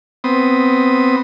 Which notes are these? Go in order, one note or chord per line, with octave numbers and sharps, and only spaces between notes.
B3 C4 D#6